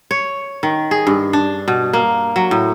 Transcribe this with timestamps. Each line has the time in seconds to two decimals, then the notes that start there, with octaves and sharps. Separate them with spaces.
0.11 C#5
0.63 D#3
0.91 G#4
1.07 G2
1.33 D4
1.68 B2
1.93 A#3
2.36 F#3
2.51 A2